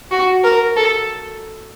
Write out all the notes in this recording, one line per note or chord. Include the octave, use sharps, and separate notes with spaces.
F#4
A#4
A4